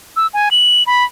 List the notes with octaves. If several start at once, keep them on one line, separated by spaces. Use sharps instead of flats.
E6
G#5
F#7
B5